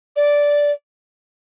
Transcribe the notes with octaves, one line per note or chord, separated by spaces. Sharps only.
D5